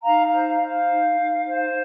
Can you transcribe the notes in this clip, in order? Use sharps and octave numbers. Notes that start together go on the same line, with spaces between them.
D#4 F5 A#5
F5
C5
F5
C5
F5
D#4
D#4
C5